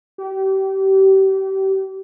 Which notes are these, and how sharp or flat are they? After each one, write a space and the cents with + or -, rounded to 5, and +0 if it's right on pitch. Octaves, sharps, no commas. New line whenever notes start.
G4 -30